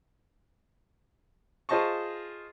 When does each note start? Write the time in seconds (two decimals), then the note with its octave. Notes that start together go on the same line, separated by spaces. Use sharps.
1.69 F4 G#4 C5 D#5 A5 C#6